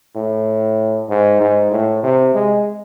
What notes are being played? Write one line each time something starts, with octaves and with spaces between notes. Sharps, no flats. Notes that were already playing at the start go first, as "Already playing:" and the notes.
A2
G#2
G#2
A2
C3
G#3